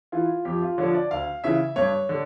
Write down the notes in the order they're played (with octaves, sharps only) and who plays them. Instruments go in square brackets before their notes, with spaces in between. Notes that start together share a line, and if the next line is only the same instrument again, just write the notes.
[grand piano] E3 F4
F2 G4
F4
D3 F3 C#5
D5
D2 F5
C#3 E3 E5
G2 C#5
D3